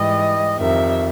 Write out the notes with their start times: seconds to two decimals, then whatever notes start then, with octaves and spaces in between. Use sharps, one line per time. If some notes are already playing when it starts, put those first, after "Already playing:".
Already playing: G#2 E3 G3 D#5
0.57 F2 C3 D#3 E5